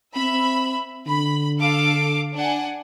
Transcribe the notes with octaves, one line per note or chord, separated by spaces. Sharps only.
C4 E5 B5
D3 B5
A4 F5 D6
D4 F#5 G#5